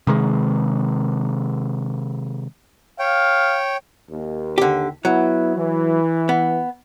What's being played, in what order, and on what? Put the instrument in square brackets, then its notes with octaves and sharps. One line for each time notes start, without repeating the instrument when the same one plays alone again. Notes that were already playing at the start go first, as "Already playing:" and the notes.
[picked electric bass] C3 D#3 G#3
[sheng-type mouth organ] C#5 G5 [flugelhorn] F5
[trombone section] D#2
[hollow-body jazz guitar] D3 G4
[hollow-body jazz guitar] F#3 [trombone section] B3 E4
[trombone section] E3
[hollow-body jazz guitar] B3